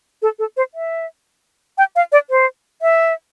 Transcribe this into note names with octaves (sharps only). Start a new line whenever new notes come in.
A4
A4
C5
E5
G5
F5
D5
C5
E5